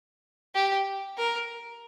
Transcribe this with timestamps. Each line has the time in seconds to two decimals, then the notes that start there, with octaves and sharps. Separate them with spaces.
0.55 G4
1.18 A#4